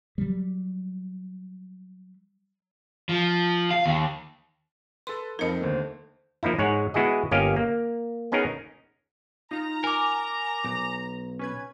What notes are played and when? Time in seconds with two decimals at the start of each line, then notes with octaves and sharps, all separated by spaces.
0.18 F#3 G3
3.09 F3
3.71 F5
3.86 D#2
5.07 A4 B4 C6
5.39 F2 F3 C4 D#4 A#4 D#5
5.61 D#2 D3 A3 C5
6.43 F3 A#3 D#4 E4
6.59 G#2 G#3 C#5 F#5
6.94 G#3 B3 E4 F#4 G#4 D#5
7.31 G1 A#3 C#4 G4 D#5 F5
7.56 A#3
8.32 B3 C#4 D#4 G#4 A#4
9.51 D#4 F4 A#5
9.84 A#4 G#5 D6
10.64 B1
11.39 C#4 B4 G#6